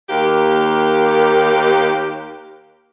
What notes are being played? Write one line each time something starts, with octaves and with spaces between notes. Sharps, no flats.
D#2 A#3 G4